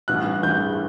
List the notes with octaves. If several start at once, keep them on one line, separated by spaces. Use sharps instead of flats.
A1 G2 E3 F#6
A1 G2 E3 G6